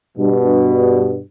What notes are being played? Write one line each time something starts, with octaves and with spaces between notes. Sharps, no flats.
G2 B2